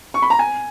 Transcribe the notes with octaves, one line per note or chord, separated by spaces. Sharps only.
C#6
B5
A#5
G#5